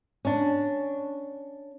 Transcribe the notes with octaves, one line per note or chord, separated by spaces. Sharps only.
C#4 D4